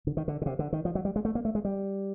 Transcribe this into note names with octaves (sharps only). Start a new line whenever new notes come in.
D3
D#3
D3
C#3
C3
D3
D#3
F3
F#3
G3
G#3
A3
A#3
A3
G#3
G3